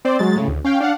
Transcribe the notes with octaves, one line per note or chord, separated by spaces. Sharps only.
C4 C5 D5
F#3 G#3 A6
A2 C#3
D2
C#4 F5 G5
D4 F5 F#5